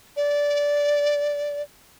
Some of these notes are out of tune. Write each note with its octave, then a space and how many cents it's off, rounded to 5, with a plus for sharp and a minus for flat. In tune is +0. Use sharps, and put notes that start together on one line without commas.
D5 -15